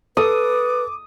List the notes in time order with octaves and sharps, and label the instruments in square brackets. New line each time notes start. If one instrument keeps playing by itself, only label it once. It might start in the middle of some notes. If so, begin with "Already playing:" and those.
[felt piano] A4 [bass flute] B4 [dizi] D6 [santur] D#6